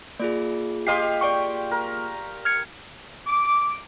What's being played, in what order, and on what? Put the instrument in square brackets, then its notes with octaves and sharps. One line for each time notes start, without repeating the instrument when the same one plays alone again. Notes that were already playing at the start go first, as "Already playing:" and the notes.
[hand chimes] A#3 F4 G#4 [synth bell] D5
[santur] G4 F5 C6 [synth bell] D#5 C7
[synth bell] D5 G5 C#6
[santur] A#4
[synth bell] F6 G#6 C#7
[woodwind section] D6